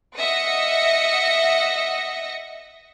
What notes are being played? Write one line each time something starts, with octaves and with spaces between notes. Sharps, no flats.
D#5 E5 F#5 D#6 A#6 C#7